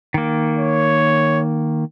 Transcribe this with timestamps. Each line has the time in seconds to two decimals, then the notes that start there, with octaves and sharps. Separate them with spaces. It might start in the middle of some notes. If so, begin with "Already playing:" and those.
0.14 D#3 A#3
0.58 C#5